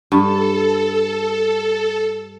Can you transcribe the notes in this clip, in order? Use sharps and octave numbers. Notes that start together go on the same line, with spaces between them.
G2 A4